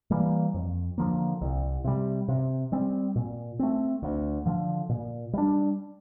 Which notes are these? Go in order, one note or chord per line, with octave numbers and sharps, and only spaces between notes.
E3 G3 A#3
F2
D3 F3 A#3
C2
C3 G3
C3
G3 C4
A#2
A3 C4
D2
D3 F3
A#2
G3 D4